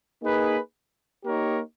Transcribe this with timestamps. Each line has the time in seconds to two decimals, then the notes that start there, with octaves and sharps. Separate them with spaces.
0.21 A#3 D#4 G#4 B4
1.23 A#3 D#4 G4 A#4 C#5